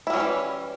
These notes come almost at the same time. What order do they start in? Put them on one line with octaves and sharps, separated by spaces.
E4 G3 F#3 C#4 E3